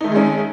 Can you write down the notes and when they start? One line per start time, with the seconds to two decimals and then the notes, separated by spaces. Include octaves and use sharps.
0.01 D#4
0.04 A3
0.08 D#3
0.12 G#3
0.15 C#4